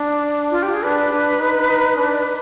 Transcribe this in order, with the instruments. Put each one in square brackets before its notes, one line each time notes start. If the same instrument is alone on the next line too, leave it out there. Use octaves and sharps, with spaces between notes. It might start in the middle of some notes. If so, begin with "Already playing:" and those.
Already playing: [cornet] D4
[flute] F4
G4
G#4
[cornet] D4 [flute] B4
[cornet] D4
D#4
D#4
D4